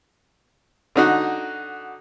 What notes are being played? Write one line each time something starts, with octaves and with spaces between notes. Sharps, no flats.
D3 D#4 F#4